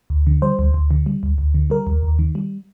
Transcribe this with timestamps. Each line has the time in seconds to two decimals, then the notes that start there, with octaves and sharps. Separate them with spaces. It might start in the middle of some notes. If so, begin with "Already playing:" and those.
0.10 D2
0.27 D3
0.42 G3 C5
0.59 D2
0.74 D2
0.91 D3
1.06 G3
1.23 D2
1.38 D2
1.54 D3
1.70 G3 A#4
1.87 D#2
2.03 D#2
2.19 D#3
2.35 G3